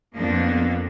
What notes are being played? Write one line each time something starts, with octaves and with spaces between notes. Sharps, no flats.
F2 F3 A#3 B3 D4